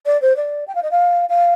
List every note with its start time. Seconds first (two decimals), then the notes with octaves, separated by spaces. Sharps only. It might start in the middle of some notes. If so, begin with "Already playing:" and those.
0.06 D5
0.21 C5
0.36 D5
0.67 G5
0.75 F5
0.82 D#5
0.91 F5
1.29 F5